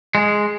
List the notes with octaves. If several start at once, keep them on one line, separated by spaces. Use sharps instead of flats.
G#3